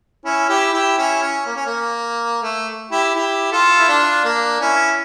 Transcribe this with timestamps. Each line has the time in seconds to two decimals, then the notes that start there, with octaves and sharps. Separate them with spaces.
0.25 C#4 E4
0.49 E4 G4
0.73 E4 G4
0.98 C#4 E4
1.22 C#4
1.46 A#3
1.56 C#4
1.66 A#3
2.42 A3
2.91 E4 G4
3.15 E4 G4
3.52 F4 A4
3.79 E4
3.88 D4 F4
4.24 A#3 D4
4.60 C#4 E4